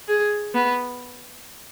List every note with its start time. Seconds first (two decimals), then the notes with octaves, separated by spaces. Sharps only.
0.08 G#4
0.54 B3